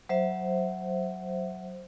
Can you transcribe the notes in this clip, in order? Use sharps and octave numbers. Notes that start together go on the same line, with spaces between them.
F#3 C5 E5